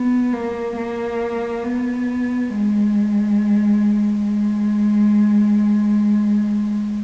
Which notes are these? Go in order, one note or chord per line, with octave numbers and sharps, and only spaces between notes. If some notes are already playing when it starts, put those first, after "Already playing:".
Already playing: B3
A#3
A#3
B3
G#3
G#3